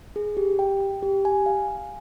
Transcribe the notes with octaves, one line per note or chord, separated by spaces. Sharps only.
G#4
G4
G5
G5
G4
G#5
F5
G#5